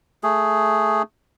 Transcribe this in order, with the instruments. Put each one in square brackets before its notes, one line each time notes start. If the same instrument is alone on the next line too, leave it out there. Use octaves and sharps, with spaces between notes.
[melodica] A3 G#4